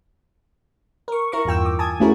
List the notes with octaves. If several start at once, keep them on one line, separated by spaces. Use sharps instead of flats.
A#4 C#6
E4 A#4 A#5 C#6
E2 G2 F4 G5 E6
D6
G#5 A5 D#6 G#6
A3 C#4 E4 F#4 G#4 A#4